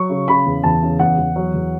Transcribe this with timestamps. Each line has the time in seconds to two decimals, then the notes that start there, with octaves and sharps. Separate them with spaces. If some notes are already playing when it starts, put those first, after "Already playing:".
Already playing: F#3 C#6
0.09 C#3
0.28 C#3 B5
0.46 E2
0.63 E2 A5
0.82 C#3
0.99 E2 F#5
1.18 E2
1.36 F#3
1.54 E2